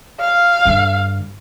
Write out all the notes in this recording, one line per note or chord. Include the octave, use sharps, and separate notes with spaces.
F5
G2 D3